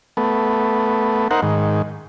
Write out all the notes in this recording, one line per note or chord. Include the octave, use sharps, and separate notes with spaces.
A3 B3
D#4 A#4 C5 F#5
G#2 D#3